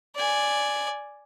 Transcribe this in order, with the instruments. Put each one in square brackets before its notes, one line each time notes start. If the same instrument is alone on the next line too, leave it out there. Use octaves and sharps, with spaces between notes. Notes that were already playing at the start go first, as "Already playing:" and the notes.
[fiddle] D5 G#5